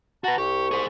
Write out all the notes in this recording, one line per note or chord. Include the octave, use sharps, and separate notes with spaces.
F#4 B4 F#5 A5 A#5
C2 G4 C#6
G#4 C5